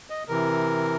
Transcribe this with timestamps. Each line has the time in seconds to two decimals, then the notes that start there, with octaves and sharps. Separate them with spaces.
0.10 D#5
0.29 C3 E3 A#4